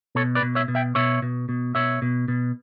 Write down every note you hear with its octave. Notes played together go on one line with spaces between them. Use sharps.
B2 A4 C#5
B4 D5
B2
C#5 E5
B2
E5 G5
B2 C#5 E5
B2
B2
B2 C#5 E5
B2
B2